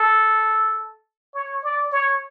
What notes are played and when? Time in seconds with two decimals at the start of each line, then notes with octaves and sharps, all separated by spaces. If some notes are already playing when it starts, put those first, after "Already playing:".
Already playing: A4
1.35 C#5
1.64 D5
1.92 C#5